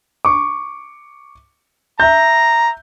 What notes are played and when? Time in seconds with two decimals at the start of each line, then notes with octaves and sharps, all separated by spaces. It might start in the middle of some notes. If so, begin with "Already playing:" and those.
0.25 C#6 D6
2.00 E5 A#5 G6